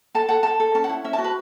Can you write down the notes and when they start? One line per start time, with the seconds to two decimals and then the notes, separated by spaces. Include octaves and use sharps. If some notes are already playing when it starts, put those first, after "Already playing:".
0.15 A4 A5
0.29 A4 F#5
0.43 A4 A5
0.60 A4
0.75 C#4 A5
0.84 F#5
0.89 E4
1.04 C#4 E5
1.13 A5
1.18 F#4
1.24 B4